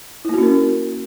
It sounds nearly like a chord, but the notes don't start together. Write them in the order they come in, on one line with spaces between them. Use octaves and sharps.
E4 A#3 F#4 C#4 A#4